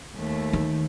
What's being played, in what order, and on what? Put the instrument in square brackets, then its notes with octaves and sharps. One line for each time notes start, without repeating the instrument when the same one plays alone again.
[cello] D#2 A3
[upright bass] D#3